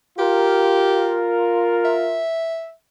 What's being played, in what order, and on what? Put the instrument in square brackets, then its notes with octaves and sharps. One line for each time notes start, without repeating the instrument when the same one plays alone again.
[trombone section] F4 A#4 [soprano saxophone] G4
[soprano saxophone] E5